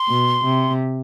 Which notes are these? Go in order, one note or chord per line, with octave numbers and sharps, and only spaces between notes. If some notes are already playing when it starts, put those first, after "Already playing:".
Already playing: C6
B2
C3